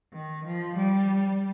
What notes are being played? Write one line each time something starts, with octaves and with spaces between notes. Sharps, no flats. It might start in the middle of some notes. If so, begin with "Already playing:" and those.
D#3
F3
G3